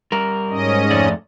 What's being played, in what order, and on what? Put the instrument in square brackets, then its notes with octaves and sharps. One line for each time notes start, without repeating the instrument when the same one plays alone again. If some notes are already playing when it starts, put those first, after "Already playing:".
[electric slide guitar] G3 A#4
[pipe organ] G#2 C#4 D#5
[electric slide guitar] F2 A3 D5